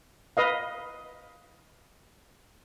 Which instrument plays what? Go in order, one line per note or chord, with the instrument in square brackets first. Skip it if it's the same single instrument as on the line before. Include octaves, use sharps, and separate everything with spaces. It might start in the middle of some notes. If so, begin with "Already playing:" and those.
[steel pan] B4 D#5 F5